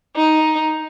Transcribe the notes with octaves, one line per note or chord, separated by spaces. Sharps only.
D#4